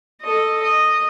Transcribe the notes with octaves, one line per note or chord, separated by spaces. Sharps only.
A4 D#5
D#5